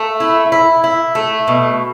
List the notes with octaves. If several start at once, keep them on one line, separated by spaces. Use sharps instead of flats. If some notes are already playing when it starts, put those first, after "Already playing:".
Already playing: A3
E4
E4
E4
A3
B2